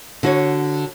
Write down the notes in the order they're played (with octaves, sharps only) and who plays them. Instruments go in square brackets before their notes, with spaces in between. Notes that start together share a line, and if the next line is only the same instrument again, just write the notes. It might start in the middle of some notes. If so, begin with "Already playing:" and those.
[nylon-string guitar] D3 F#4 C#5